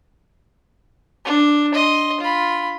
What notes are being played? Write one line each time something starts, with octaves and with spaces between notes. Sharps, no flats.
D4
D#5 C6
F4 B5